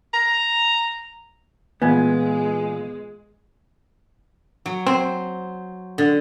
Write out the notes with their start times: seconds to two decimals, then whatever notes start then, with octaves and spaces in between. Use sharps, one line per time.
0.14 A#5
1.82 A#2 E3 G#3 B3 G#5 G#6
4.66 F#3
4.87 C4 C5
5.98 D3